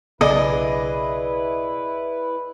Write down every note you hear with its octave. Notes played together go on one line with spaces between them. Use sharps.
B1 C#3 B3 E4 G#4 B4 D5 D#5